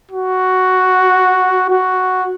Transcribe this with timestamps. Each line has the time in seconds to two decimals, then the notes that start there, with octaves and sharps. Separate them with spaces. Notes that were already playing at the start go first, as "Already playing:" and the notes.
0.11 F#4
1.70 F#4